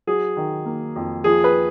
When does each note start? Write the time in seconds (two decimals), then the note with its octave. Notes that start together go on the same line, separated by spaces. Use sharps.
0.07 F#3 G#4
0.37 D#3
0.66 A#3
0.96 F2
1.24 F3 G#4
1.44 B4